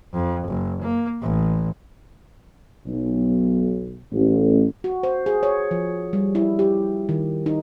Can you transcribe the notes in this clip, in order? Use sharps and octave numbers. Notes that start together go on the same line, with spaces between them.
F2
F#1
A#3
A1
B1
A1
F#4
C5
G#4
C#5
F3
G3
E4
G4
D#3
D#4